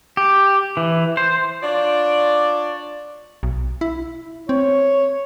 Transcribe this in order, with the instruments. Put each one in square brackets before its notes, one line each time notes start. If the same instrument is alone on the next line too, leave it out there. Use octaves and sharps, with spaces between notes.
[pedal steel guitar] G4
E3
C5
[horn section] D4 F4 C#5 D5
[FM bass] B1
E4
[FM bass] C4 [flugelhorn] C#5